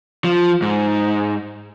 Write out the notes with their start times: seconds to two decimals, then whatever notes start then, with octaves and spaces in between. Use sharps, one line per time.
0.24 F3
0.62 G#2